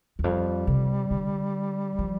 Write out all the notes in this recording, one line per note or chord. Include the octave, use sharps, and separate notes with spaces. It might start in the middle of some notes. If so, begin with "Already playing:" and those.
E2
F2 G3
C3
D3
F3